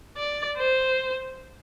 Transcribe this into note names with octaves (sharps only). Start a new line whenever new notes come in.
D5
C5